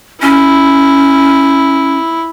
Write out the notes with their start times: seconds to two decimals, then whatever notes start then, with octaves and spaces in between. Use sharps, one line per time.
0.22 C#4 E4